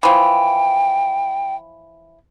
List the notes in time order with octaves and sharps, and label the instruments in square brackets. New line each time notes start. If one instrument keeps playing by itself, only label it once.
[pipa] E3 F3 [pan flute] G5